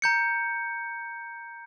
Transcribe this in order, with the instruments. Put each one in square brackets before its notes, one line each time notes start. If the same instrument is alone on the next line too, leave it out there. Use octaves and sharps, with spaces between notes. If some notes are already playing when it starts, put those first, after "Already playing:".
[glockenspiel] A#5 G6 C#7